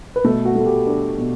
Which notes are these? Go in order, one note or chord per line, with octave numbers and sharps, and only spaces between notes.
B4
B2 A3 A4
F#4
A3
A4
G4
D4
B2